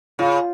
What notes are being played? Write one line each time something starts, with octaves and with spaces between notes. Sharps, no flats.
C#3 F4